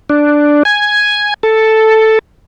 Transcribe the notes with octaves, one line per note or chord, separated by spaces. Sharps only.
D4
G#5
A4